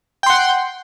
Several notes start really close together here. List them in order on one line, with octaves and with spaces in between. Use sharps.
G5 C6 F#5